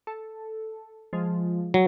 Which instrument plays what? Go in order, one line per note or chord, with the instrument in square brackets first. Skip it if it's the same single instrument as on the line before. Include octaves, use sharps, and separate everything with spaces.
[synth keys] A4
F3 G#3
[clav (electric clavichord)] F#3